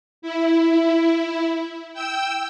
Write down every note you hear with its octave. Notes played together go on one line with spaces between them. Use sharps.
E4
G5 E6